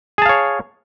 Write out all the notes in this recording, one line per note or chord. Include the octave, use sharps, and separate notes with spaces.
G#4 C#5 F5 A5